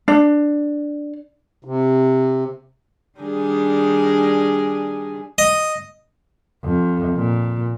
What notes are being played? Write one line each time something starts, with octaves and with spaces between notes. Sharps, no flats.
D4
C3
D#3 G3 D4 G#4
D#5
F2
A#2